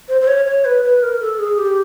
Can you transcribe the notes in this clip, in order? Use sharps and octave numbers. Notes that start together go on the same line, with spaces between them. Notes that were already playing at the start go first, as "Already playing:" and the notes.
C5
C5
C#5
C#5
B4
B4
A#4
A4
G#4
G4